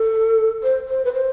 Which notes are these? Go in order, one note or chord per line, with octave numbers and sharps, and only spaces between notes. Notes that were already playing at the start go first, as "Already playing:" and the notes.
Already playing: A4
C5
C5
B4
C5